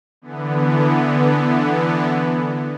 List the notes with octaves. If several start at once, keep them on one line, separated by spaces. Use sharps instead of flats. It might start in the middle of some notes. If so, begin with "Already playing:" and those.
D3 E3 B3